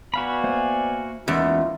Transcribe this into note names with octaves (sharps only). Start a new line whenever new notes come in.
B3 F#4 D5 F5 G#5 B5
A#3 C5 E5
E2 G#3 A#3 C#4 D#4 F4 G4